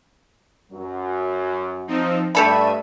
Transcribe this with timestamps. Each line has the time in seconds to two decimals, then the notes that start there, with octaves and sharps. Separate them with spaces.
0.72 F#2 F#3
1.87 F3 C4 D#4
2.35 G2 A3 G4 A4 D5 E5 B5 D#7